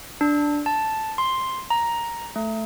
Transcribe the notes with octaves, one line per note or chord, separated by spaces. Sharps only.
D4
A5
C6
A#5
A3